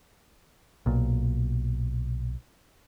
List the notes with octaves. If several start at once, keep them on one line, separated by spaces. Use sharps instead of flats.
B1 A#2